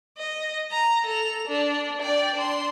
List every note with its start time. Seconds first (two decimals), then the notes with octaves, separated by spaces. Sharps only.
0.17 D#5
0.71 A#5
1.06 A4 F7
1.48 D4
2.02 D5 G5
2.36 D4 C6